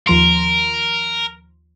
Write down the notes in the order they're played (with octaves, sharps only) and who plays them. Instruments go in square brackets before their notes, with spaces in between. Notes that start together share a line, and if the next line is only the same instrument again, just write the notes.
[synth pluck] D#2 F3 C6 [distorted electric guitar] A#4